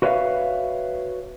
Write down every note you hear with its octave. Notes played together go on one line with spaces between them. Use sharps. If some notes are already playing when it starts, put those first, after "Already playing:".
F#4 B4 C#5 E5 F5